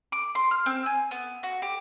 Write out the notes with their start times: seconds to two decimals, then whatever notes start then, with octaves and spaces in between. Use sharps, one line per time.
0.12 D6
0.35 C6
0.51 F6
0.66 C4
0.86 G#5
1.11 B3
1.43 F#4
1.62 G4